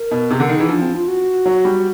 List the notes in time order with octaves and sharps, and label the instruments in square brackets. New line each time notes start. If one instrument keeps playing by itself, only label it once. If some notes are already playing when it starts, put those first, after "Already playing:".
Already playing: [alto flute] A#4
[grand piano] B2
[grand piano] C3 [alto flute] G#4
[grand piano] D3 [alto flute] A#4
[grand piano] D#3
[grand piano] E3 [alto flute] G#4
[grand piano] F3 [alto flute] D4
[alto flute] C4
F4
F#4
[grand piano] F#3
G3